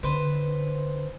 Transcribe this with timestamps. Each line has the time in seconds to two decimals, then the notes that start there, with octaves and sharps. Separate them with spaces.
0.03 D3 B4 C5